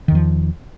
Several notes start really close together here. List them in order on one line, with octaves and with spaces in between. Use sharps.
D#3 E2 F3